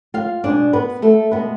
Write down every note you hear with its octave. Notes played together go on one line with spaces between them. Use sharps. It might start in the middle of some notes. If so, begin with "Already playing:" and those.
F4 F5
B2 G#3 D4 D5
B3 B4
A3 A4
B2 G#3 B3 B4